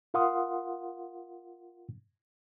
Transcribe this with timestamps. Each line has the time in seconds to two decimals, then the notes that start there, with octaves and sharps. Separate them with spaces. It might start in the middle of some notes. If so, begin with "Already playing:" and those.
0.14 F4 A#4 F5 F#5 C6 D#6